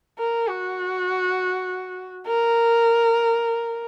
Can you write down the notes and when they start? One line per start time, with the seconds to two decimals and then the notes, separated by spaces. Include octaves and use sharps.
0.19 A#4
0.47 F#4
2.27 A#4